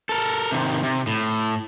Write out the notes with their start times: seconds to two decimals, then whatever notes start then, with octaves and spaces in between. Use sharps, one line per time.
0.09 A4 A#4
0.51 C3 D#3
0.83 C3
1.07 A2